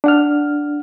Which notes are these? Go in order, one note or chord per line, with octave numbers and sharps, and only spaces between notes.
D4 F#5 F6